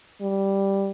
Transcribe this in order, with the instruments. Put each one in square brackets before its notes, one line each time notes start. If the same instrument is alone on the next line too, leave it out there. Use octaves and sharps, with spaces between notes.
[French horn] G3